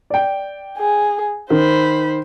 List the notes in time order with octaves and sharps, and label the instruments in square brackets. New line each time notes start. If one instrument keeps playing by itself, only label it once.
[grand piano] D5 G5
[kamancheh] G#4
[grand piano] D#3 [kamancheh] C5 B5